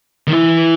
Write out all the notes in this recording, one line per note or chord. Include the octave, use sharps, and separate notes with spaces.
D#3
E3